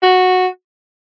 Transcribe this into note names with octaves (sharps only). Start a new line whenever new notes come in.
F#4